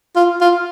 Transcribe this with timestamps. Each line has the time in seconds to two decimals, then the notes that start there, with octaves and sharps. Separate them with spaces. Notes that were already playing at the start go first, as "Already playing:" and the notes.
0.16 F4
0.41 F4